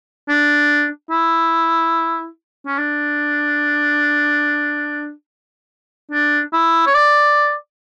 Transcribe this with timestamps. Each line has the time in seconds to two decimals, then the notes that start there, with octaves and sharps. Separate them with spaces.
0.29 D4
1.11 E4
2.67 C#4
2.78 D4
6.12 D4
6.53 E4
6.87 C#5
6.94 D5